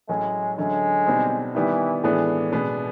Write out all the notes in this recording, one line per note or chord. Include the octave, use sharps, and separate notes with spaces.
A2 F#3 G#3 A3 C#4
D3 F#3 G#3 A3 C#4
B2 G3 C4 D#4
D#3 E3 G3 B3 E4
A2 E3 G#3 B3 D4
B2 G#3 B3 D4